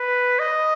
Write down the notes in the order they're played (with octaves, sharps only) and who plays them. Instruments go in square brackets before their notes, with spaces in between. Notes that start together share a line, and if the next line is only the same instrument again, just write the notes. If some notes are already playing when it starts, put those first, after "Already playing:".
Already playing: [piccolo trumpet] B4
D#5